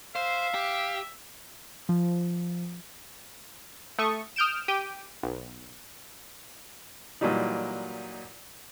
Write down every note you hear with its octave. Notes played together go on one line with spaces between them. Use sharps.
C5 E5 F5
G4
F3
A3 A4 C#6 D#6
D#6 F6 G6 D7 E7
G4 G5 D#7
B1
A#2 E3 F#3 G3 D#4